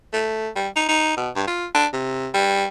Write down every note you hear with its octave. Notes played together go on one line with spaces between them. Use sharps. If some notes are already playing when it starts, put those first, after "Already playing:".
A3
G3
D#4
D#4
B2
G2
F4
D4
C3
G3